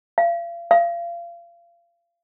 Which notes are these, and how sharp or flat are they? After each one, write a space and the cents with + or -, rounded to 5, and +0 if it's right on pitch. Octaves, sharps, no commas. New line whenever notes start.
F5 -40
F5 -30